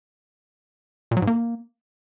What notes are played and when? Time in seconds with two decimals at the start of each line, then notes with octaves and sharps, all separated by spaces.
1.11 A#2
1.17 F#3
1.22 G#2
1.27 A#3